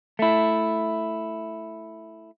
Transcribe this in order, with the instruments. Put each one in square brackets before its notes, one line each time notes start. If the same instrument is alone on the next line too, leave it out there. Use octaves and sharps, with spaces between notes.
[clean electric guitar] A3 E4